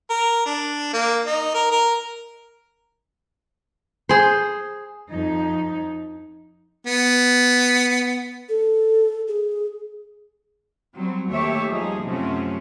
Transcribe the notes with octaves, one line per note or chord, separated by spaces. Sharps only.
A#4
D4
A#3
D#4
A#4
A#4
G#4 C5
F2 D#4
B3
A4
G#4
F#3 G3 C4
D#2 A3 A#3 G4 C#5 E5
F3 G3 D#4 G#4
F#2 C3 F3 F#3 A3 C#4